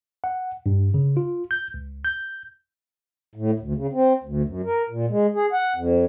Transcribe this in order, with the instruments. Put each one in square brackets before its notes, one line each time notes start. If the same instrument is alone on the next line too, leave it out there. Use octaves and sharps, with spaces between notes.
[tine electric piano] F#5
G2
C#3
F4
G6
C#2
G6
[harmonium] A2
D2
C#3
C4
D2
F#2
A#4
A#2
G#3
G#4
F#5
F2